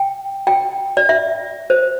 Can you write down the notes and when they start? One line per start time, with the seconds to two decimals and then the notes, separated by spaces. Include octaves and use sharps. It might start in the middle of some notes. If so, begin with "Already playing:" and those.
Already playing: G5
0.47 G5
0.97 D5
1.09 E5
1.70 C5